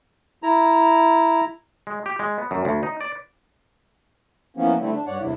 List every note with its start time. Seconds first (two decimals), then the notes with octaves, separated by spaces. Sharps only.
0.43 E4 A#5
1.87 G#3
2.06 G4
2.19 G#3
2.38 B3
2.51 F#2
2.65 D2
2.83 D#4
3.01 D5
4.57 E3 F3 A#3 B3 C#4
4.80 D3 G3 A3 C4 E4
4.92 D4
5.06 G2 C#5 D5 F#5
5.20 E2 G2 C3 E4